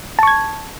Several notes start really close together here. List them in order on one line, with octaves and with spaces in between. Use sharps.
A5 C#6 G#6